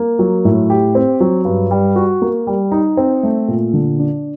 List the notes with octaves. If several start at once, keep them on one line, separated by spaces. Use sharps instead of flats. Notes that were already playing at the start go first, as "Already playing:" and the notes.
Already playing: A#3
F#3
A2
G4
C4
F#3
G2
G3
F#4
A#3
G3
D#4
C4
A3
A#2
D3
D4